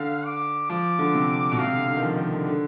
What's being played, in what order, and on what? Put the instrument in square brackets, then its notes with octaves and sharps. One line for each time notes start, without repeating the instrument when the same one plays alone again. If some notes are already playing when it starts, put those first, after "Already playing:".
Already playing: [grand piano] D3 [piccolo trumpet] F5
[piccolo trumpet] D6
[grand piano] F3 [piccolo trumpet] D6
[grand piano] D3
C3
B2
[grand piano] C3 [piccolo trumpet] F5
[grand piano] D3
D3
D#3
F3
D#3
D3
D3